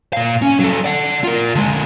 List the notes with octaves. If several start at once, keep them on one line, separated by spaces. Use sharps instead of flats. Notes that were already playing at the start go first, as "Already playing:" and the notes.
A#2 F5
C#4
F#3 A4
D5 F#5
F4 A#4
D3 G#3